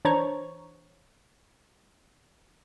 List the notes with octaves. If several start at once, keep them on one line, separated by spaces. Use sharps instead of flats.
E3 D4 C5 C#5 A#5 C#6